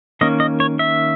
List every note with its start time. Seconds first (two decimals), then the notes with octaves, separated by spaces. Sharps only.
0.21 D#3 A#3 C#4 D#5
0.40 D#5
0.60 C#5
0.79 E5